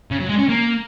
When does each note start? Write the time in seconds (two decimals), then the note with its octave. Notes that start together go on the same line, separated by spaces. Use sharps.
0.11 C#3
0.20 F#3
0.29 G#3
0.39 C#4
0.49 A#3